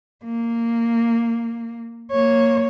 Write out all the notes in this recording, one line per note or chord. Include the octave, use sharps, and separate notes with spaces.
A#3
A#3 C#5